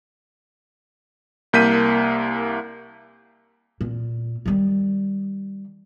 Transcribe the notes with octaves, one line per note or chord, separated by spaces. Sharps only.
C2 A#3 G6 B6 D#7
A#2
D#3 G3